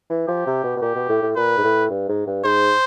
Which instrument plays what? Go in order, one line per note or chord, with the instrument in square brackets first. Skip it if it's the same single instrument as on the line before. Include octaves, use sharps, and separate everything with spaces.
[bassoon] E3
[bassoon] F3 [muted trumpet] G4
[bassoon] C3
B2
B2
[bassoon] A#2 [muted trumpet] G4
[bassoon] B2
A2
A2
[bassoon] A#2 [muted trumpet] B4
[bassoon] G#2
A2
G2
G#2
G2
[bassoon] G#2 [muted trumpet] C5